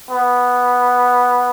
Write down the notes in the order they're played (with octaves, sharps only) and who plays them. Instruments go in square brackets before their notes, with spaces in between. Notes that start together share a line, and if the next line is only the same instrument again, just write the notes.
[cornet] B3